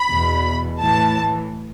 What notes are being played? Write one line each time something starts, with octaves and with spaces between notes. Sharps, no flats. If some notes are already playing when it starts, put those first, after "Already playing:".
Already playing: B5
E2 B2
A2 E3 A5